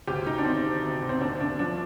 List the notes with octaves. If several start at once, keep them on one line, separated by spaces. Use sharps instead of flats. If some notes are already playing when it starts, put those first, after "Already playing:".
D2 G4
D2 D#4
D4
D#3 C4
C3
D2
D2
C4
D#2 D4
D#2 D4
F3 D4